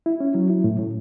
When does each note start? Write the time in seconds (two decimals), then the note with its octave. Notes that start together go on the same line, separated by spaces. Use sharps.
0.06 E4
0.20 C#4
0.35 F#3
0.50 E4
0.64 A2
0.79 A2